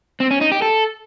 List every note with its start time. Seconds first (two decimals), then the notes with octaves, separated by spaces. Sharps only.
0.20 C4
0.31 C#4
0.41 D#4
0.52 G4
0.62 A4